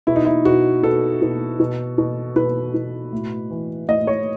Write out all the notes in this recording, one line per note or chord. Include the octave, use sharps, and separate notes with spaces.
B2 E4
D#4
E4
B2 F#4
B2 A4
B2
B2
B2
B2 B4
B2
A2
E3
A2 D#5
C#5